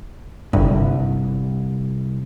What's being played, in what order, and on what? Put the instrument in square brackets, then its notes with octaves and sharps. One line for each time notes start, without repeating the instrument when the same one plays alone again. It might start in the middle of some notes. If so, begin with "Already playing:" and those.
[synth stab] G1 G2 [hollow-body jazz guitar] C2